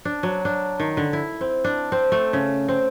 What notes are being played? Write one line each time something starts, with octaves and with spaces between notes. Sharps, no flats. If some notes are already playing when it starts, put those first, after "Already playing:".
D4
F#3
D4
D#3
D3
E4
C4
D4
C4
A3
C#3
C4